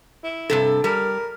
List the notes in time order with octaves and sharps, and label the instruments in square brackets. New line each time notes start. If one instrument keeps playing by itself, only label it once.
[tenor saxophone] E4
[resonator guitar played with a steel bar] G2 C3 A4
[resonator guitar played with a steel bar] G3 [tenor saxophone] A#4